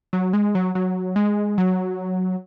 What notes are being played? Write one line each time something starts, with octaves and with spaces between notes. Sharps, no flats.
F#3
G#3
F#3
F#3
G#3
F#3